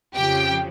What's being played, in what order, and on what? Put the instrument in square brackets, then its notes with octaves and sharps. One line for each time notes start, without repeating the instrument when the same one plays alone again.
[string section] F2 C#3 F3 G4 G5